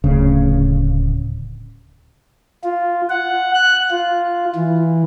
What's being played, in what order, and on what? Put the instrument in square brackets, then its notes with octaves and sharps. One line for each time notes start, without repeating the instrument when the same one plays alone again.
[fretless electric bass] D1 C#3
[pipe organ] F4
F#5
F#6
F4
E3